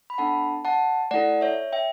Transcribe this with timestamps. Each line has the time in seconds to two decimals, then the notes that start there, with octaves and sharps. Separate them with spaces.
0.10 B5
0.18 B3 D4 A4 F#5 A5
0.65 F#5 A5
1.11 A3 E4 A4 D5 F#5
1.41 C#5 E5
1.72 E5 G5